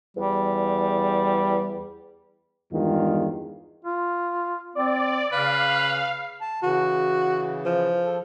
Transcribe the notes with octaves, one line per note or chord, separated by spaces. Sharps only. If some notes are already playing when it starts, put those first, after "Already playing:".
E2 G3
E2 G2 D#3 G#3 F4
F4
C4 D5
C#3 B4 F5
A5
C#3 E3 F#4
F3
A4